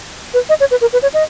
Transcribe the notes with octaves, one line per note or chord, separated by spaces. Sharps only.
B4
D#5
C#5
B4
A#4
B4
C#5
D#5